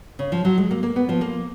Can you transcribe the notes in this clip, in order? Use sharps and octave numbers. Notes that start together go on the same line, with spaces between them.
C#3
F3
F#3
G#3
A#3
A#3
B3
F3
A#3